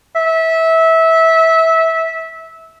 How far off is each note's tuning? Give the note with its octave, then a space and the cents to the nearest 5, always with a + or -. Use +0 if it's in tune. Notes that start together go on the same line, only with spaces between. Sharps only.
E5 -20